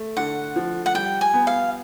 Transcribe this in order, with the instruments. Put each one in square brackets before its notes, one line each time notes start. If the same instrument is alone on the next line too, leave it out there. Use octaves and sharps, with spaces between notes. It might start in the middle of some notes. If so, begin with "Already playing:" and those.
Already playing: [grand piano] A3
[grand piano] D3 [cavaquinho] F#5
[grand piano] F3
[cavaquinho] F#5
[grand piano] G3 [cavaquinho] G5
[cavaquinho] G#5
[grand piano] B3
[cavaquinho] F5